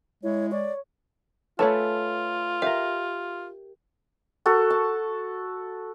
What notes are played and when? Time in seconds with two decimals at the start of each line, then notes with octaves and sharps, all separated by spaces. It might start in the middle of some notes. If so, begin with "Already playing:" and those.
0.23 G#3 E4 C#5
0.52 C#5 D5
1.59 A3 F4 A4 B4 C#5 G#5 A5
2.62 G4 A#4 E5 F5
4.46 F#4 A4 A#4
4.70 A5